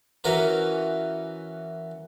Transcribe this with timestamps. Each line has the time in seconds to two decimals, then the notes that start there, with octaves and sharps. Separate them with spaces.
0.24 E3 C#4 F#4 A#4 B4